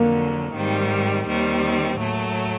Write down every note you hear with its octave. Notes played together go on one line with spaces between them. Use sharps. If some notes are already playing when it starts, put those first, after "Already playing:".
Already playing: F2 D3 F#3 A#3
G#2 D#3 G3 C4
D#2 D#3 G3 C4
A2 F#3 A3